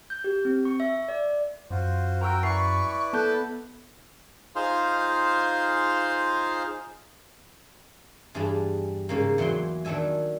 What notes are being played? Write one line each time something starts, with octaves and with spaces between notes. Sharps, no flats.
G6
G4
C4
C#6
E5
D5
F#2 F4 F#4 C5
F#4 A#4 G5 A#5 C#6 E6
E4 B4 D5 G#5 A#5 C#6 C7
B3 A4 A5 F#6 G6
D#4 F4 G#4 C5 F5 C6
E2 G2 G4 G#4 A5 B5
G#2 C#3 A#3
E2 F#3 E4 G5 C6
D#3 F#3 D4 E5 G#5